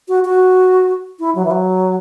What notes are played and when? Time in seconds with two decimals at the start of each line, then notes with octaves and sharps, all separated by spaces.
0.09 F#4
0.25 F#4
1.19 E4
1.35 F#3
1.45 E3
1.51 F#3